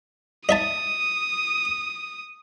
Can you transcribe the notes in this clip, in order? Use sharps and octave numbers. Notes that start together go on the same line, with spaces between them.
D#5 E5 A5 D#6